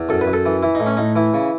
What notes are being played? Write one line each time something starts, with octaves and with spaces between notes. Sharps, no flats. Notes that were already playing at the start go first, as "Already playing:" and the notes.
Already playing: E2
F#2 A4
B4
F#2
A4
E3
E3 E4
D#4
A2
C#4
A2 D#4
E3 E4
C#3